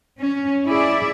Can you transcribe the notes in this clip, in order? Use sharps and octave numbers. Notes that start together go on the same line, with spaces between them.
C#4
E4 G#4 D5 E5